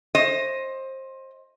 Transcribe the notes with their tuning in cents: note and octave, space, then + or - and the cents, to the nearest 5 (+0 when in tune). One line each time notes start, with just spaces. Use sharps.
C5 +20 D#5 +5